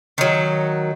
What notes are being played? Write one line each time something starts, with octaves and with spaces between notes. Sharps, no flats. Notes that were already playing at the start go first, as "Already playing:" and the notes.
D#3 F#3